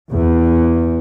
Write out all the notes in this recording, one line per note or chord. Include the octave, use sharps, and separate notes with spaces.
E2